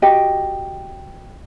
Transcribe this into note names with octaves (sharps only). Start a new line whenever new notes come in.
F#4 G4 D#5